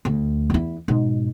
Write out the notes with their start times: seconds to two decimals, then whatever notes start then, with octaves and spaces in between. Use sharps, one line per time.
0.05 D2 A3
0.50 E2 E4
0.88 G#2 B2